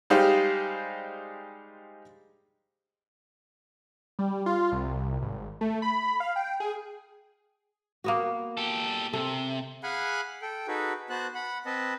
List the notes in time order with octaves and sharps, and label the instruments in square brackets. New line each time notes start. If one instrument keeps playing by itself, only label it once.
[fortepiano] G3 G#3 D#4 G4 C5 F5
[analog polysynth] G3
F4
C2
G#1
A3
B5
F5
G5
G#4
[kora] A#3 B3 F#4
[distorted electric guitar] G4 A4
[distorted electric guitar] C3 [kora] A4
[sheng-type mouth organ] G#4 F5 F#5 G#5 B5 F#6
A4 G5
D#4 F#4 G#4 A4 B4
B3 F#4 C5 A5 F#6
F#5 B5
C4 B4 D#5 A5